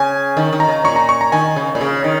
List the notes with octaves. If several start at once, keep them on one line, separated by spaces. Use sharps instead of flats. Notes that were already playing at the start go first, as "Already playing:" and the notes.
Already playing: C#3 G#5
D#3
D#3
A#5
C#3
A#2 C#6
A#5
C#6
A#5
D#3 G#5
C#3
A#2
C#3
D#3